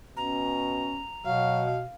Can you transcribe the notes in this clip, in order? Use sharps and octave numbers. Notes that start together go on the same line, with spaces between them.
B2 C#4 A#5
B2 F#3 F5